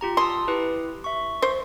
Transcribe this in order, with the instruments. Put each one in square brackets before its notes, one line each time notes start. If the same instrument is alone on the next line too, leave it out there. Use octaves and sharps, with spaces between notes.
[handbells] F4 G4 A#5
[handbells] A5 D#6 E6 [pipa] C6
[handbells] E4 G4 B4
E5 C#6
[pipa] C5